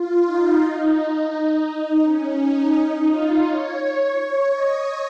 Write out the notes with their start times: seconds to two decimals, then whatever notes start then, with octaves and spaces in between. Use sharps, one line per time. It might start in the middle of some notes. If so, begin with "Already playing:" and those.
Already playing: F4
0.26 D#4
1.67 D#4
2.03 C#4
2.39 D#4
2.75 D#4
3.10 F4
3.46 C#5
4.53 D#5